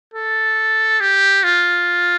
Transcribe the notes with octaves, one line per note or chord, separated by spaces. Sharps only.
A4
G4
F4